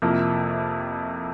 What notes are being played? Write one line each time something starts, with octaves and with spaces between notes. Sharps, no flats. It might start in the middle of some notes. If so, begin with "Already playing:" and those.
F2 C3 F3 A#3 E4